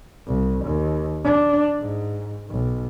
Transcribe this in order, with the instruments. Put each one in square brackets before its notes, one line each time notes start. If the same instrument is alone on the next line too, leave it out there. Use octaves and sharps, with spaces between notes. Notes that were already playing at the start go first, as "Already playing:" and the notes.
[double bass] C2
D#2
D4
G#2
B1